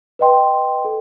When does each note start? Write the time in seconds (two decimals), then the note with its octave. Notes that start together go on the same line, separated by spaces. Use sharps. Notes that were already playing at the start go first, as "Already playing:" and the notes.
0.19 B4 D#5 G5 C6
0.85 A4